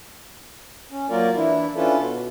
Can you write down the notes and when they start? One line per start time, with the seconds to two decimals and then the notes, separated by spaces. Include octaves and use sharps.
0.91 C#4
1.10 F#3 A#3 F4 A#4 D5
1.35 E3 D4 E4
1.76 C#4 D4 E4 F4 A4 B4
1.98 B2